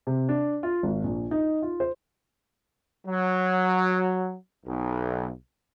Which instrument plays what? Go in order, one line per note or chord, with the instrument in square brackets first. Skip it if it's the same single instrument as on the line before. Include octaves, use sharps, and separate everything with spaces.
[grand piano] C3
D4
F4
G#1
A#1
D#4
F4
C5
[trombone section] F#3
B1